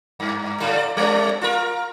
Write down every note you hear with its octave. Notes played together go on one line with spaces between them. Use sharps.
G2
A2 D3 G3
D5
G3 C4 D4
F4 A#4